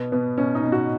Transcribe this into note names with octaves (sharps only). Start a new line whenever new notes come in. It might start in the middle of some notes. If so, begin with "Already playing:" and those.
Already playing: B2 B3
B2 B3
B2 C#4
D#4
B2
F#4